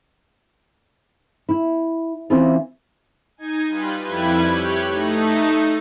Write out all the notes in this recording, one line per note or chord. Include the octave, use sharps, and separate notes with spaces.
E4
E3 A#3 C4 C#4 E4 F4
D#4 G#5
G3 F4 B4
F2 G3 E4 B4 G#6
G4 C#5 F#6
A3 D#4